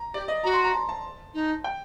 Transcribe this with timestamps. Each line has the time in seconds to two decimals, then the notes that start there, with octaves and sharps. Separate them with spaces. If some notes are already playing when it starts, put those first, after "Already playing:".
Already playing: A#5
0.14 G4 D5
0.28 D#5
0.43 F#4 A#5
0.54 C6
0.64 A#5
0.74 A5
0.89 A5
1.34 D#4
1.64 G5